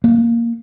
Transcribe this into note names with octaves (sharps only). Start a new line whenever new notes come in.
A#3